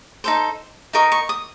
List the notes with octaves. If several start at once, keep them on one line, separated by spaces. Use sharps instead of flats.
D#4 A4 C5
D#4 A#4 D#5 C#6
C#6
D#6